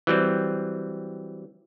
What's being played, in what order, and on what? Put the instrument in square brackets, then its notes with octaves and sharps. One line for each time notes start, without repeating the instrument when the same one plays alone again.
[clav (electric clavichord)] E3 F#3 G3 C4